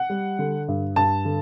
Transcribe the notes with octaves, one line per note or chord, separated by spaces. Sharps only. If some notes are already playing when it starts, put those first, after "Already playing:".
Already playing: F#5
G3
D3
G2
G2 A5
D3